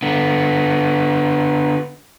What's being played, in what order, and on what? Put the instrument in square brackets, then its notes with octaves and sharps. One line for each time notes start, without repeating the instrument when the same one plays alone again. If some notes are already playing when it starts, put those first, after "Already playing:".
[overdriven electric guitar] D3 B3